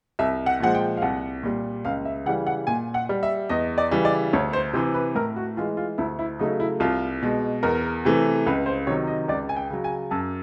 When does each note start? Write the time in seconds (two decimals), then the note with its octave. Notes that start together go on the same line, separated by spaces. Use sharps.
0.19 C2 E5
0.46 F#5
0.60 A#2 F3 G#3 F#5
0.75 G5
0.97 F5
1.02 C2 F#5
1.43 A#2 G3
1.85 C#2 F5
2.05 E5
2.26 C#3 E3 G3 F#5
2.47 F#5
2.67 A#2 G#5
2.94 F#5
3.09 G3
3.23 E5
3.49 E2 D#5
3.78 D5
3.91 C#3 E3 G3
4.05 D5
4.33 D2 C#5
4.53 C5
4.73 C3 E3 C5
4.94 B4
5.15 A2 A#4
5.36 F#4
5.57 E3 G#3 F4
5.77 F4
5.98 D2 E4
6.19 E4
6.39 C#3 F#3 A3 D#4
6.60 E4
6.80 C2 F4
7.23 B2 G#3
7.63 E2 A#4
8.05 C3 E3 A3
8.46 C#2 B4
8.66 C5
8.87 C3 D#3 F#3 C#5
9.07 D#5
9.28 C#2 D5
9.49 G#5
9.56 G5
9.70 C#3 F#3
9.84 G#5
10.11 F#2 A5